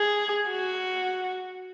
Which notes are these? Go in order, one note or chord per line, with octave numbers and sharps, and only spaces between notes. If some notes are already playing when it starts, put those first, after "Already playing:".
Already playing: G#4
F#4